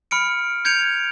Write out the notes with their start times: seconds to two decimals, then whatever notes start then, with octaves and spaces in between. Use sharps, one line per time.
0.11 B5 F6 C#7 D7
0.65 G6 G#6 C#7 D7 F7